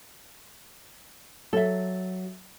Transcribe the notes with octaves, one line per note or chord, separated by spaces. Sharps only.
F#3 A4 E5